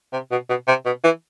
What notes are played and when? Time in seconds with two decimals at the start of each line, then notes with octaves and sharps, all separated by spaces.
0.13 C3
0.31 B2
0.49 B2
0.68 C3
0.86 B2
1.04 E3